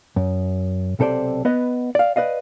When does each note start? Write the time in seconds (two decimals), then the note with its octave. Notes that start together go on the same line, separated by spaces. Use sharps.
0.16 F#2
0.99 B1 C3 A4 C5 D5
1.45 B3 B4 D#5
1.95 D5 F5
2.16 B4 D5 D#5 F5